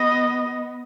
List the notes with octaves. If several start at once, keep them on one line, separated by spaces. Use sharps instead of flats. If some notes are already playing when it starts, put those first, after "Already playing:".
Already playing: B3 D#5